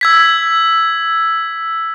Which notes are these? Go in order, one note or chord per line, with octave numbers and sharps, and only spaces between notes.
E6 G#6 B6